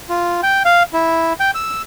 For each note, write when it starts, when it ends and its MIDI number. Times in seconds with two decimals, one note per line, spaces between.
0.09 0.41 65
0.43 0.63 79
0.65 0.83 77
0.93 1.33 64
1.40 1.51 79
1.55 1.82 88